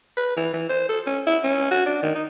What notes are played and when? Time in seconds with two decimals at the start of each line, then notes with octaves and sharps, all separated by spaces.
0.17 B4
0.36 E3
0.53 E3
0.69 C5
0.89 A4
1.06 C#4
1.27 E4
1.44 C#4
1.71 F#4
1.86 D4
2.02 D#3
2.15 D#4